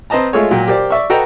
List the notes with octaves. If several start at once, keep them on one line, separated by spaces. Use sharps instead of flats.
C4 B4 D#5 A5 A#5
G#3 A3 F4 G#4 A4 C#5
A#2 F#3 G5
G4 A#4 C5 D5
D5 E5 C#6
F#4 A4 B4 D#5 G5 A#5